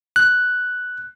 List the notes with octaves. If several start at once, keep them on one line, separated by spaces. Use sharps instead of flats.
F#6